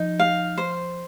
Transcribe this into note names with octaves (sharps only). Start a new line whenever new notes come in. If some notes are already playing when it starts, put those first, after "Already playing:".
Already playing: F3 D#4
F5
C5